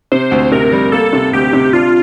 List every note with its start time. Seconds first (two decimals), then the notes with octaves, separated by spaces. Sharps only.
0.12 C3 C5
0.31 D2
0.52 C3 A#4
0.72 G3
0.92 A#3 A4
1.13 C3
1.33 D2 G4
1.53 C3
1.73 D4 F4